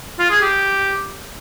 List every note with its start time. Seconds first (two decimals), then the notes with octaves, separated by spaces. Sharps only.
0.19 F4
0.30 G#4
0.41 G4